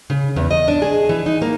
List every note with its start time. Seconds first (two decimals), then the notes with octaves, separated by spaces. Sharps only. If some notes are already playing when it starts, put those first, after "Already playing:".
0.10 C#3
0.36 E2
0.51 D#5
0.68 D4
0.82 G#4
1.09 E3
1.26 D#4
1.42 A#3